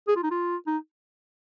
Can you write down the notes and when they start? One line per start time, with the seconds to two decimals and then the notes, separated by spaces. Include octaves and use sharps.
0.08 G#4
0.16 F4
0.23 D#4
0.31 F4
0.67 D#4